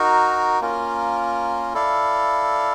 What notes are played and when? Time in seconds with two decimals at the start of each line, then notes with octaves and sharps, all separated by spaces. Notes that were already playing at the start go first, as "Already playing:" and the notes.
Already playing: D#4 F#4 A#4
0.60 A#3 C#4 F4 A#4
1.74 E4 A4 D5 F5